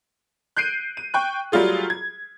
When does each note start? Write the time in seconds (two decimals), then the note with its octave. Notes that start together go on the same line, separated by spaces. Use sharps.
0.57 F#6 G6 C7 D7 D#7
0.97 D#7
1.14 G5 C#6 F#6
1.52 F#3 G3 A3 F4 G#4
1.90 G#6